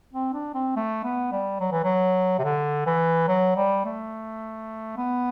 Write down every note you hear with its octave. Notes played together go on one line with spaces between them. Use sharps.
C4
D4
C4
A3
B3
G3
F#3
E3
F#3
C3
D3
E3
F#3
G3
A3
B3